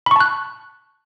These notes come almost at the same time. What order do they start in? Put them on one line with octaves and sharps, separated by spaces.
B5 C#6 A5 F#6